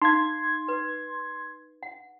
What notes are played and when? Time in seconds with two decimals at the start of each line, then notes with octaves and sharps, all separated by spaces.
0.02 D#4 F5 C6 G#6
0.68 B4
1.83 F#5